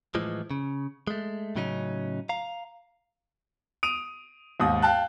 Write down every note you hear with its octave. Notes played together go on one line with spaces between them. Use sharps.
A2 E3 F3 G#3
C#3
G#3 A3
A2 C#3 F#3 C#4 D#4
F5 A#5
D#6 D7 D#7 F7
D#2 G#2 D#6
F5 G5 A5 F#6